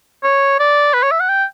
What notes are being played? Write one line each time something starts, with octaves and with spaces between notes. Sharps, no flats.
C#5
D5
B4
C#5
E5
F#5
G5